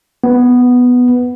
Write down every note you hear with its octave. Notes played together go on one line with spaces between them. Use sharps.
B3